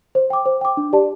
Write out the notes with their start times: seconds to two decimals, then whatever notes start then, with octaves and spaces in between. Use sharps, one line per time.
0.15 C5
0.30 G5 D6
0.46 C5
0.61 G5 D6
0.77 D4
0.93 G4 D5 A5